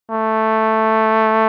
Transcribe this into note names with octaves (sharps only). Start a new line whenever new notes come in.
A3